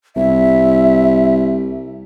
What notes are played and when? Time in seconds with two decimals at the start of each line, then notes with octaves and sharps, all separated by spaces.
0.16 C2 E5